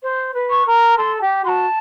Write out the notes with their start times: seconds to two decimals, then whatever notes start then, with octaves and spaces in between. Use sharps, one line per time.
0.02 C5
0.34 B4
0.50 C#6
0.66 A#4
0.97 A4 C6
1.21 G4
1.44 F#4 C6
1.48 A5